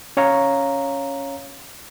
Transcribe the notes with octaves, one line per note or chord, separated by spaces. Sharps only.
C#4 C#5 F5 A#5